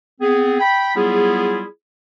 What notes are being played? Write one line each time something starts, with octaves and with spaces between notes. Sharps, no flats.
B3 C4 G#4
G5 B5
F#3 G3 B3 E4 F4 G#4